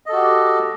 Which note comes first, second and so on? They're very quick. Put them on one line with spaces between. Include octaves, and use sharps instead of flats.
D#5 A4 F#4 G4